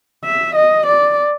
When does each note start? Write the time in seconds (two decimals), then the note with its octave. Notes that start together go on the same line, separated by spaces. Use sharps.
0.24 E5
0.55 D#5
0.86 D5